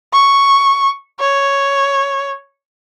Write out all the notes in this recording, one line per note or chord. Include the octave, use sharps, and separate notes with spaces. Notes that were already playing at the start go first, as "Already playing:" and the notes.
C#6
C#5